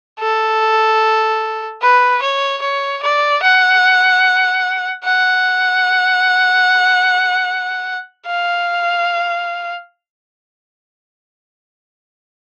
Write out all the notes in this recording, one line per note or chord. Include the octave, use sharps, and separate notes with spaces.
A4
B4
C#5
C#5
D5
F#5
F#5
F5